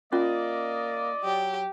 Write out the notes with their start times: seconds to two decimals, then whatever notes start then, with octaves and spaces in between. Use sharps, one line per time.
0.12 A#3 C#4 F4 D5 D#5
1.24 F#3 G4